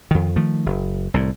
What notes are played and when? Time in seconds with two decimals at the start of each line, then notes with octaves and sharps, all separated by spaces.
0.11 F2 D#3
0.36 D#3 F3 A3
0.66 F#1
1.14 C2 A2